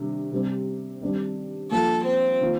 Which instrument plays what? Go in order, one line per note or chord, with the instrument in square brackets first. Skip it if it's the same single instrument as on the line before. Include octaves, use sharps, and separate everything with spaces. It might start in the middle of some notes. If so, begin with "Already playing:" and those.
Already playing: [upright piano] C3 D#3 G3 D4
C3 G3 C4
G2 D#3 G3 C4
[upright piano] F3 A#3 F4 [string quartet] A4
[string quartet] C4
[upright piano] D#3 A#3 F4